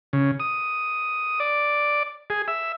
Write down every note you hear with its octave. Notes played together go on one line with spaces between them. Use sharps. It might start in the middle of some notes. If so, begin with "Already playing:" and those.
C#3
D#6
D5
G#4
E5